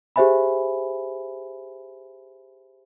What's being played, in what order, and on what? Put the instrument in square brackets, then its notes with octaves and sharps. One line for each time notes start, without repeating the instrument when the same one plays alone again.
[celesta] G4 G#4 C5 E5 G#5 B5